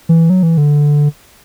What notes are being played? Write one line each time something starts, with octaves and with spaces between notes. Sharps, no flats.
E3
F#3
E3
D3